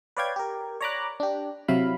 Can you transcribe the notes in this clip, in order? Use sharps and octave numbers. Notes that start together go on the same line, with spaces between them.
B4 C#5 D5 F5 G5 G#6
G4 A#4
C#5 D5 A#5 B5 D6 F#6
D4 G4
C3 F#3 E4 F5 B5